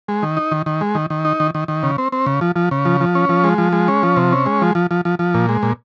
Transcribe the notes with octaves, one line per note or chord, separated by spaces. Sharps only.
G#3
D#3
D#4
D#3
D#3
G#3
D#3
D#3
D#4
D#3
D#3
D#3
C#3
C4
C4
C#3
F3
F3
C#3
F3
F3
C#4
F3
G#3
F3
G#3
C#4
F3
C3
C#4
G#3
F3
F3
F3
F3
F3
A#2
G#3
A#2